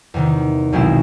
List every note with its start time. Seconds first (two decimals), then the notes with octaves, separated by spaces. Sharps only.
0.14 E2 C3 D#3
0.73 B1 B2 G#3 C4 E4